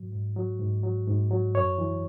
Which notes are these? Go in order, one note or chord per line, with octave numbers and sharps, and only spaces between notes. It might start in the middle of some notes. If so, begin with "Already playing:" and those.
Already playing: G#2 F#3
G#2
F#3
G#2
F#3
G#2
F#3
F#2 C#5
E3